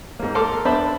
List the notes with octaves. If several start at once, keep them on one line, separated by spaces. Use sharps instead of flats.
G#2 A#3
A4 A#4 C6 D6 F6
B3 D4 C5 E5 A5 B5